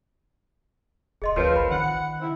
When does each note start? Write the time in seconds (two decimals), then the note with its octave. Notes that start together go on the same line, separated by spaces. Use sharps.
1.22 E1 G#4 D#5 C6
1.36 D2 F3 C4 A#4 B4 C#5
1.56 A1 B5
1.71 D#3 F#5
2.21 C#3 C4 E4